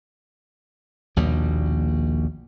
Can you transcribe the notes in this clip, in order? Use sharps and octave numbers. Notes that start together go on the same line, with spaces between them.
A#1 D#2 B2 G3